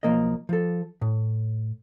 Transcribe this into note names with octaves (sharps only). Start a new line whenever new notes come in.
B1 F3 A#3 A#4 D#5
F3 A4
A2